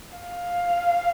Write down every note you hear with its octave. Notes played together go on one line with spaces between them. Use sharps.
F5